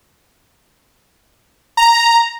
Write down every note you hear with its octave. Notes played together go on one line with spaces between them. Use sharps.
A#5